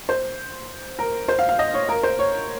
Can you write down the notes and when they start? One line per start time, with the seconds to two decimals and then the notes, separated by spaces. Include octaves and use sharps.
0.09 C5
0.99 A#4
1.28 C5
1.39 F5
1.49 F5
1.59 D#5
1.74 C#5
1.89 A#4
2.03 C5
2.19 C#5